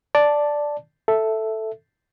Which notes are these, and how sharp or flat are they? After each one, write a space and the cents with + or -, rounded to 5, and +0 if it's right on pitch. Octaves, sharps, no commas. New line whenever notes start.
D5 +0 A5 +0
A4 +0 E5 +0